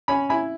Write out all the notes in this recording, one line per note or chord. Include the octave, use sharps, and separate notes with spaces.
C#4 G#5 B5
E4 G#5 B5